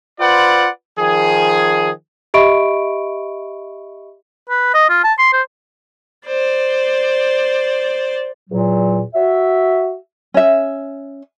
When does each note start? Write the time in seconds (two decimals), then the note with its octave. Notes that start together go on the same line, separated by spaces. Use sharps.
0.19 F4 B4 C5 D5 F#5
0.98 D#3 F3 G#4
2.34 G4 D#5 E5 B5 C#6 D7
4.50 B4
4.74 D#5
4.90 F4
5.04 A5
5.19 C6
5.33 C5
6.27 C5 D5
8.50 E2 A#2 F#3
9.15 F#4 E5
10.34 C#4 E5